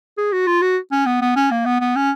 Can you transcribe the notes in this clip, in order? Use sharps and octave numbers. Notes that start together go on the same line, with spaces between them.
G#4
F#4
F4
F#4
C#4
B3
B3
C#4
A#3
B3
B3
C#4